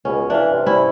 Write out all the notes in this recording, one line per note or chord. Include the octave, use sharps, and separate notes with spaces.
C#2 B2 C#4
E3 D4 F5
G2 C3
G3 C#4 E4